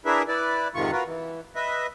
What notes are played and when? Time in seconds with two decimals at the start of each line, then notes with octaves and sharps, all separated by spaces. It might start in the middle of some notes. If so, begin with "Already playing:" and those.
0.06 D4 E4 G#4 A#4 B4 E5
0.28 E4 B4 D5
0.75 F2 G#2 C3 D#3 F4 C#6
0.92 F4 F#4 A#4 B4
1.06 E3
1.56 B4 D#5 E5